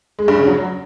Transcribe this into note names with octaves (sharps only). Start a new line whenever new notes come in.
G#3
G2
C#3
F#3